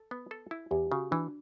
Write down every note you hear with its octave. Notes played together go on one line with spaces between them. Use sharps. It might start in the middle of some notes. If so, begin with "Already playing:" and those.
Already playing: A4
B3
A4
E4
E2 G4
C#3 F#4
E3 D4